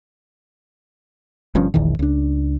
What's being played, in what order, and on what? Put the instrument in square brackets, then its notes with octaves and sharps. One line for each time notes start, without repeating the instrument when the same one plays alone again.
[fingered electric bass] G1 G2 F3 C#4
E1 A#1 E2 D#3
C#2 D4